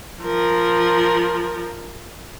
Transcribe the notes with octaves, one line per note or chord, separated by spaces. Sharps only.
F3 A#4